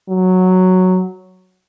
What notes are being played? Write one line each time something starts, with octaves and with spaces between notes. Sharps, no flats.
F#3